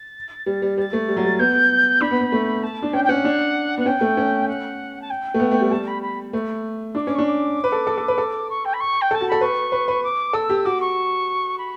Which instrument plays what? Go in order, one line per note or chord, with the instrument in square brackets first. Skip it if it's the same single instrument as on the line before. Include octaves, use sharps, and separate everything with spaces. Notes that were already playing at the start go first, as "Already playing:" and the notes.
Already playing: [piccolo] A6
[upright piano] G3
G3
[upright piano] G3 [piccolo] A6
[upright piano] A3
G3
F#3
G3
[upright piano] B3 [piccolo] G6
[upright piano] D4 [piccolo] B5
[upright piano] B3
B3
A3
[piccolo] A5
[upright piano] D4
[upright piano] C#4 [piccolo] G5
[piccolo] G5
[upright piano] C#4 [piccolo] F#5
[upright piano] D4
[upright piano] B3 [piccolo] F#5
[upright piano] C#4 [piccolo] G5
[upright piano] A3
C#4
[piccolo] F#5
A5
G5
[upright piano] A3
B3
A3
G3
[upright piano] G3 [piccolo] A5
[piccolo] B5
B5
[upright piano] A3
[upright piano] D4 [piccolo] D6
[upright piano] C#4 [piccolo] D6
[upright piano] D4 [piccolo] C#6
[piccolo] D6
[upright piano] B4
A4
A4
A4
B4
A4
[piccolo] C#6
G5
B5
C#6
G5
[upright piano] A4
[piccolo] A5
[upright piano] F#4
[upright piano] A4 [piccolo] B5
[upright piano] B4 [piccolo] C#6
[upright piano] B4
B4
[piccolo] D6
[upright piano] A4 [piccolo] E6
[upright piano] G4
[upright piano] F#4 [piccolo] D6
[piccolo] C#6
B5